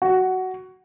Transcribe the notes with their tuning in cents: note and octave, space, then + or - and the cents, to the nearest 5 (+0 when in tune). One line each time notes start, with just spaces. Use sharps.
F#4 +10